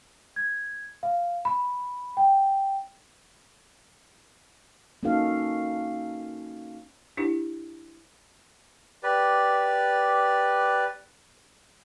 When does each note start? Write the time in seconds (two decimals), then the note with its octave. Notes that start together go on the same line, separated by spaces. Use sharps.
0.36 G#6
1.03 F5
1.45 B5
2.17 G5
5.03 A#3 C#4 D#4 F#4 A4 F5
7.17 D4 E4 G4
9.03 G4 B4 D5